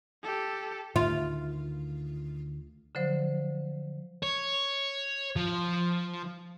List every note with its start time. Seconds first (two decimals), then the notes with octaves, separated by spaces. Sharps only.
0.23 G4 A4
0.96 D2 D#3 F4
2.95 D3 F3 F#3 C5
4.23 C#5
5.36 F3